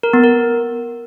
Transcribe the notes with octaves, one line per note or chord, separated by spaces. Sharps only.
A#4
B3
A#4